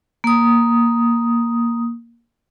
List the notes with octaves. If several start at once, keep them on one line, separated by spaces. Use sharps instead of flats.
A#3 D#6